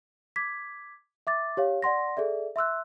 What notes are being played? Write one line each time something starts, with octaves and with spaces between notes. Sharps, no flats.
D6 G#6 B6
E5 D6 A6
G4 C#5 F5
D5 F#5 C6 A#6
G#4 A4 D5 E5
E5 C6 E6 F#6